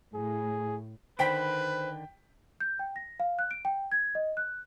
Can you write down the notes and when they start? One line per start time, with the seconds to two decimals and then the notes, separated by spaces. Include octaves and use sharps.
0.15 A2 G#4
1.19 D3 D#3 B4 C5 G5 B5 B6 D7
2.60 G6
2.79 G5
2.96 A#6
3.20 F5
3.39 F#6
3.51 D7
3.65 G5
3.92 G#6
4.15 D#5
4.37 F#6